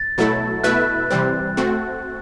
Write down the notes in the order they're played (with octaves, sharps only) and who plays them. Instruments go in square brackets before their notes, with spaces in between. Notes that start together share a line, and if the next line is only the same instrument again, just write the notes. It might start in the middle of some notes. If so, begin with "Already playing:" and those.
Already playing: [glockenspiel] A6
[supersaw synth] B2 F#3 A3 E4 A4
[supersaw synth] B2 A3 E4 B4 E5 [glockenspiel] F#6
[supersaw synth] C3 E3 G3 C4
A3 C4 F#4